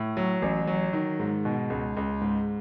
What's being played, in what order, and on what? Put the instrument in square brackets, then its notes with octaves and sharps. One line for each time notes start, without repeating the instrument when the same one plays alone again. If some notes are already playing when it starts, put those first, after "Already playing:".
Already playing: [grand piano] A2
F#3
A1
F#3
D#3
G#2
B2
C#2
C#2
G#2